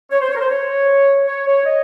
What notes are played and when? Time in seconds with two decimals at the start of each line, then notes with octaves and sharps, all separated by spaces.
0.11 C#5
0.21 C5
0.31 C#5
0.36 A#4
0.40 C5
0.50 C#5
1.28 C#5
1.46 C#5
1.66 D#5